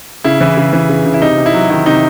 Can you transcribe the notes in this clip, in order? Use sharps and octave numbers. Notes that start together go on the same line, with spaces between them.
C#3 E4
E3
C#3
E3
C#3
C#3
E4
C3 D#4
C3
E4
F#3
D#3 E4
C3 D#4